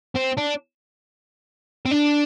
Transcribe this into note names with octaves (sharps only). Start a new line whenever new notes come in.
C4
D4
C4
D4